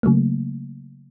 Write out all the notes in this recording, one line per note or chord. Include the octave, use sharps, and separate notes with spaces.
C#3 F#3 A3 A#3